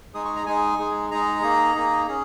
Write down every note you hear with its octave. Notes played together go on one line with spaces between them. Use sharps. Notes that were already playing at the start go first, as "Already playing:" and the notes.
G#3 D#4 G#4 D#6
C#6
A#5
G#3 D#4 G#4 G#5
G#3 D#4 G#4
G#3 D#4 G#4 A#5
A#3 D#4 G#4
A#3 D#4 G#4
C#4 G#4